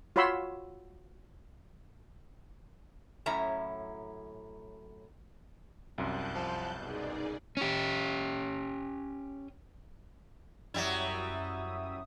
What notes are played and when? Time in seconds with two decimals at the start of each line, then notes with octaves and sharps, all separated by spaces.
0.16 F4 F#4 C#5 B5 C6 E6
3.26 F#2 A2 C#4 E4 A#5
5.98 C2 F#2 A5 F#6 G6
6.35 F3
6.78 B2 D#4 G#4 D5
7.57 C#4 G4
10.74 F#2 F#3 G3 E4 E5 D#6